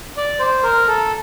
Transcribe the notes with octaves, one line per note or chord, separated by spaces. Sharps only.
D5
C5
A#4
A4